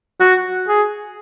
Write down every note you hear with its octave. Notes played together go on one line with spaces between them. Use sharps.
F#4
G#4